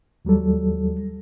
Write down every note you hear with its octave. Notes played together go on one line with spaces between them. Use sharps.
D#2 F#3 G3 A4